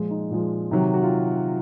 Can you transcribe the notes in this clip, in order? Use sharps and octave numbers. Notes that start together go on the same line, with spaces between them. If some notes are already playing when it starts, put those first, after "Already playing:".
Already playing: A#2 F3 G#3
D#4
A#2 F3 G#3
C3 D#3 F#3
F#4
F4